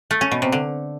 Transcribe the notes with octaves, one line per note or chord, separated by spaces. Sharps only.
A3
C#4
B2
C3
D3